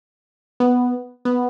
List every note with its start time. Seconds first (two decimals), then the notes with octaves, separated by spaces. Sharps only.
0.60 B3
1.25 B3